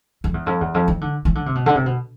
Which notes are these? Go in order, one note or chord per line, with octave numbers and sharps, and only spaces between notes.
F2
E2
F2
E2
F2
E3
D3
E3
D3
C3
B2
D3
C3
B2